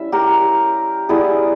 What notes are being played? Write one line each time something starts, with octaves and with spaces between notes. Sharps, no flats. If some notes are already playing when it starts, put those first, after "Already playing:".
Already playing: G3 C#4 E4 E5
G4 A#4
G3 B3 E4 G#4